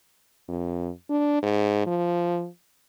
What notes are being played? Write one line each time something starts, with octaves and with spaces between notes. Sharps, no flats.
F2
D4
G#2
F3